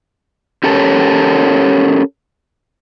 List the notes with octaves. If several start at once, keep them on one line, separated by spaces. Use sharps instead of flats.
C#4 G4 A4 A#4 C#5 A5